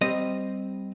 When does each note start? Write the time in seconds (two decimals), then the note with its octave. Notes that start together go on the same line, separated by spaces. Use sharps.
0.01 G3 C4 D#5